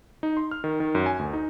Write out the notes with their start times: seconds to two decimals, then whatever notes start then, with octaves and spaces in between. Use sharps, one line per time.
0.23 D#4
0.37 C6
0.51 F6
0.64 D#3
0.80 D#3
0.95 F#2
1.06 G#5
1.19 D2
1.33 D#4